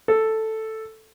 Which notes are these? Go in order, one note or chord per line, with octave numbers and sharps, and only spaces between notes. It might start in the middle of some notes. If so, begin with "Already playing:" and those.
A4